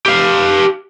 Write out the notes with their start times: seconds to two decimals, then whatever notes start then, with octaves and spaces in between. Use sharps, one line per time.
0.06 G4 F5